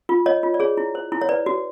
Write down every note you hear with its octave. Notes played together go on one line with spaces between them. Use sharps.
F4
C#5 D#5
F4
D5
G#4 C#5
E4
C5
E4
C#5
B4 D5
F#4